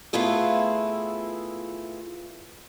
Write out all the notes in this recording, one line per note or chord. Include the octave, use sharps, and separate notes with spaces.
A3 B3 E4 F4 G#4